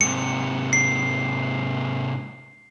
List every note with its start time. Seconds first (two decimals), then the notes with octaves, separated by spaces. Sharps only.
0.01 G#2 C3 C#7
0.73 C7